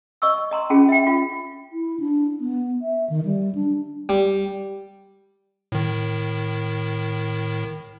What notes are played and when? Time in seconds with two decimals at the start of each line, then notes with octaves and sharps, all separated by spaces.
0.22 D#5 C#6 E6
0.51 D#5 A#5 C6
0.70 C#4 F4 F#4 G#4
0.89 E5 G5
1.07 F4
1.73 E4
2.00 D4
2.40 B3
2.82 E5
3.10 D#3
3.25 G3
3.55 D4
4.09 G3
5.72 A2 D#3